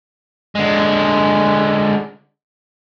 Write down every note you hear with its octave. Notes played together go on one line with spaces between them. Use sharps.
D3 G#3